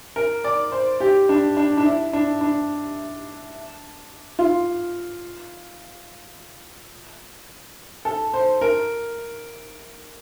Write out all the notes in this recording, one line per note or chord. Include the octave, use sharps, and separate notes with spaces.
A#4
D5
C5
G4
D4
D4
D4
E4
D4
D4
F4
A4
C5
A#4